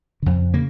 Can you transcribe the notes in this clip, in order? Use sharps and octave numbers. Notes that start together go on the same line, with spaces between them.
F2 C#3
C#3 A#3